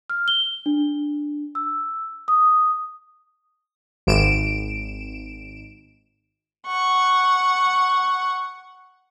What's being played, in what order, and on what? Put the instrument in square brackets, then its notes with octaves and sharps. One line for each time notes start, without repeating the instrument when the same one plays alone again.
[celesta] F6
G7
D4
E6
D#6
[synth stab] G#1 D7 E7
[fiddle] F#5 C#6